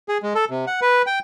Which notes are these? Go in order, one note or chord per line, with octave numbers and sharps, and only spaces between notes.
G#4
G#3
A4
C3
F#5
B4
G5